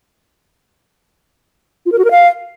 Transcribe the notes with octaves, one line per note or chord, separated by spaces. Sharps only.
F4
A#4
F#4
A#4
F5